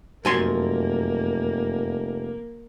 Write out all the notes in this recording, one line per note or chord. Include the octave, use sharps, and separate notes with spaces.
F1 F#2 A#3 G#5 C6